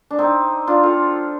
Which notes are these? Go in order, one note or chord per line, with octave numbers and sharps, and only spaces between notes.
D4
C4 D#4
D4 F4
F4 A4